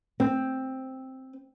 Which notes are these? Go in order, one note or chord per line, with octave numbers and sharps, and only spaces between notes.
C4